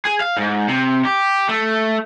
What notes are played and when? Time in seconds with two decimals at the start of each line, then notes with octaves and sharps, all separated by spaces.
0.05 G#4
0.21 F5
0.37 G#2
0.68 C3
1.06 G4
1.49 A3